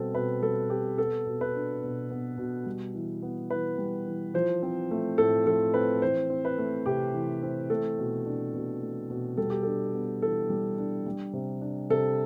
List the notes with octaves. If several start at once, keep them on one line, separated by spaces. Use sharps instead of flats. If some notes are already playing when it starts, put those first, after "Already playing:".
Already playing: B2 G3 C4 A4
B2 B4
G3 A4
B2 G4
B3 A4
B2
B4
D4
B2
B3
B2
G3
E3
B3
E3 B4
G3
E3
F3 C5
C4
A3
A2 A4
F3 A4
C4 B4
E3 C5
C4
B4
A3
C3 G4
E3
C4
A3 A4
B2
D4
B2
A3
B2
G3 A4
G4
D4 A4
B3
E3 A4
G3
D4
G3
C3
D4
C3 A4